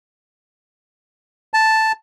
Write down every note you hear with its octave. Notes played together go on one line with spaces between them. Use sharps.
A5